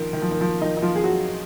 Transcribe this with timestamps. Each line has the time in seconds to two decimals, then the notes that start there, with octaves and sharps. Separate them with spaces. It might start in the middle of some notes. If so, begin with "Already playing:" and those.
Already playing: D#3 F3
0.13 D#3
0.22 F3
0.31 D#3
0.41 F3
0.61 D#3 D#4
0.77 D#4
0.82 F3 F4
0.95 G#4
1.04 F#3 F#4